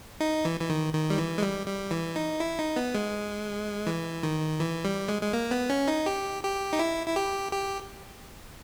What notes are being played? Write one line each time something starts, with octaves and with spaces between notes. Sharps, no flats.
D#4
E3
E3
D#3
D#3
G3
E3
G#3
G3
G3
E3
D#4
E4
D#4
B3
G#3
E3
D#3
E3
G3
G#3
G#3
A#3
B3
C#4
D#4
G4
G4
D#4
E4
E4
G4
G4